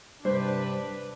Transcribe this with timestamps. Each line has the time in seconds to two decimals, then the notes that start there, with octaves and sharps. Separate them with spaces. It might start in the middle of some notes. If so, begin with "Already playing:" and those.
0.25 G2 C3 D4 B4 C5